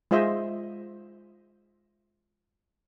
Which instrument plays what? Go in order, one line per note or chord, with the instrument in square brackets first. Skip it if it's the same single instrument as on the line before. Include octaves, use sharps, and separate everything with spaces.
[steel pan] G#3 F4 C5 D#5 E5